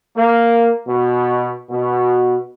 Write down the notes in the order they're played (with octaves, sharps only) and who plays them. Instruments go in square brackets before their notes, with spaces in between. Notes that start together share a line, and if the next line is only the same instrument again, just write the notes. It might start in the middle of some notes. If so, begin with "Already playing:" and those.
[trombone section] A#3
B2
B2